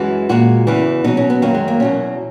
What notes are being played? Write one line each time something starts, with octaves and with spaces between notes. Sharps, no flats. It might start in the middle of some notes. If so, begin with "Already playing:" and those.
Already playing: F#2 E3 G#3 F#4
A#2 G#3 F#4
E2 C#3 E3
B2 F#3 D#4
C#4
B3
F#2 D#3 F#3 A#3
G#3
A#3
E2 B2 F#3 C#4